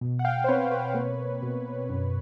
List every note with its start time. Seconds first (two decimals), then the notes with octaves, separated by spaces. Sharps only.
0.01 B2
0.19 F#5
0.25 F5 G5
0.44 C5
0.48 C4 B4 C#5
0.71 B4 C#5
0.94 A#3
1.43 B2
1.89 F#2